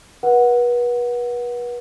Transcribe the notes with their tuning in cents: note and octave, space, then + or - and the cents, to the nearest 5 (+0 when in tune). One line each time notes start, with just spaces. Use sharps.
B4 -35 F#5 -5